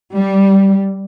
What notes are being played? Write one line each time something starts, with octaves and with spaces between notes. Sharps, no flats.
G3